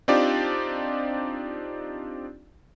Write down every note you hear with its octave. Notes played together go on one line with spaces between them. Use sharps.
C4 D4 D#4 F4 G4 D5